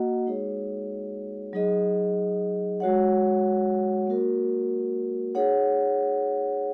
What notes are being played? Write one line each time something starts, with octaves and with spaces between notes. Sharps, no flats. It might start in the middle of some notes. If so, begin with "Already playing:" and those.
Already playing: A#3 F#4 D#5 F#5
G#3 D#4 G#4 C#5
F#3 D#4 G#4 D#5
G#3 F#4 C#5 F#5
A#3 F#4 A#4
D#4 G#4 C#5 F#5